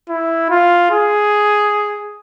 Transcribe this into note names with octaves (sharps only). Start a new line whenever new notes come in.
E4
F4
G#4